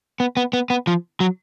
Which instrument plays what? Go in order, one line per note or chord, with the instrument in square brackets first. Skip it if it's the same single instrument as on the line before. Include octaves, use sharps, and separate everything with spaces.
[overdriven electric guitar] B3
B3
B3
B3
F3
F#3